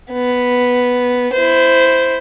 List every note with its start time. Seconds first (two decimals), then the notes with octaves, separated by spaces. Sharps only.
0.12 B3
1.32 E4 C5